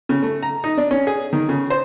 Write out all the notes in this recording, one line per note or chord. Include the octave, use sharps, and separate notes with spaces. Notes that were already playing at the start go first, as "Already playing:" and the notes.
C#3
A3
A#5
D#4
D4
C#4
G#4
D#3
C#3
C5